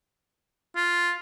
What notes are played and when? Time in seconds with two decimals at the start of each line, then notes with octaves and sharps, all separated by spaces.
0.76 F4